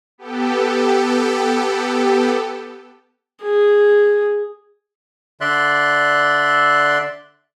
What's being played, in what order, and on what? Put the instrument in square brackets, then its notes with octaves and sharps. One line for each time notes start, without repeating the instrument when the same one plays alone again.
[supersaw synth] B3 G4 A4
[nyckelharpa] G#4
[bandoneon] D3 D5 E5 C6 F#6